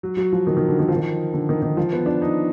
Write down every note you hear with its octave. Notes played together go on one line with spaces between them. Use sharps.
F#3
F#3
F3
D#3
D#3
D3
D#3
F3
D#3
D3
D#3
D#3
F3
B3
D4
D#4